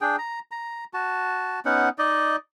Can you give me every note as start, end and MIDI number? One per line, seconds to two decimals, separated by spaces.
0.01 0.16 62
0.01 0.16 68
0.01 0.16 79
0.18 0.39 82
0.51 0.85 82
0.94 1.60 66
0.94 1.60 81
1.65 1.89 59
1.65 1.89 61
1.65 1.89 63
1.65 1.89 78
1.98 2.36 63
1.98 2.36 74
1.98 2.36 75